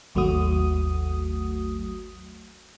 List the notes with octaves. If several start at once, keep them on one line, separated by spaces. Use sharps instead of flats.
G#1 D#2 F#3 A3 F#4 D#6